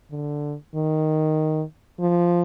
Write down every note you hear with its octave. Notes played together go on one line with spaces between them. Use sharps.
D3
D#3
F3